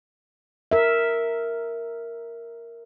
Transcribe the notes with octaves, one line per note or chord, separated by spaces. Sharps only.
A#4 E5